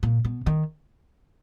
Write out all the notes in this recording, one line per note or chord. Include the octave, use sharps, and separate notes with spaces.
A#2
B2
D#3